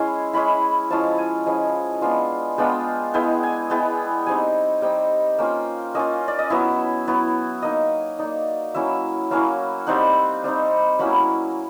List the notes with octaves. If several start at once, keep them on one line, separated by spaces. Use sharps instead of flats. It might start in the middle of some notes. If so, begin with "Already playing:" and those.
Already playing: G#3 C#4 E4 C6
G#3 C#4 E4 B5
F3 G#3 C#4 E4 A5
G#5
F3 G#3 C#4 E4
G#3 B3 D4 F4
G#3 B3 D4 F4 G5
G#3 B3 E4 G5
G#5
G#3 B3 E4 G5
G3 C4 D#4 G#5
G3 C4 D#4 G5
A#3 C#4 F4 G5
A#3 C#4 F4 D#5
D5
D#5
F#3 B3 E4 E5
F#3 B3 E4
A#3 D#4 D#5
A#3 D#4 D5
F#3 A#3 C#4 E4 E5
F#3 A#3 C#4 E4 F5
G3 C4 D#4 F#5
G3 C4 D#4
F#3 A#3 C#4 E4 B5